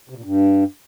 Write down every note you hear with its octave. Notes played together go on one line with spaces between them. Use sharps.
C3
A#2
G2